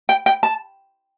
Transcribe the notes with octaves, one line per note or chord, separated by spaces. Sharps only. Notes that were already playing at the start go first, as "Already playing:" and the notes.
G5
G5
A5